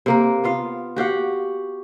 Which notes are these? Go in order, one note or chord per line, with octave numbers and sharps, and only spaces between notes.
C3 A#3 A#4
B3 F4 F5
F#4 G4 F5 F#5